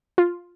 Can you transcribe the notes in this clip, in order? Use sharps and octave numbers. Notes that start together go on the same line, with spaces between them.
F4